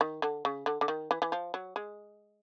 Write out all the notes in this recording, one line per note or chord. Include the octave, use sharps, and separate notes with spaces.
D#3
D3
C#3
D3
D3
D#3
E3
E3
F3
F#3
G#3